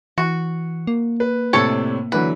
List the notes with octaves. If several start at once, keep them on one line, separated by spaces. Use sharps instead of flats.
E3 F#4
A#3
B4
A2 C3 D4 A4 C#5
D3 E3 F#3 B4